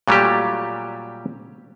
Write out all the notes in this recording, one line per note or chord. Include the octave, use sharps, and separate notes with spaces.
A#2 F#3 G3 A3 G4